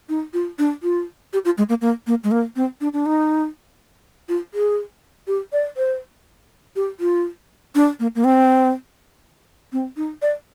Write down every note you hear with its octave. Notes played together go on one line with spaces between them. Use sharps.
D#4
F4
D4
F4
G4
F4
G#3
A#3
A#3
A#3
G#3
A#3
C4
D4
D4
D#4
F4
G#4
G4
D5
C5
G4
F4
D4
A#3
A#3
C4
C4
D#4
D5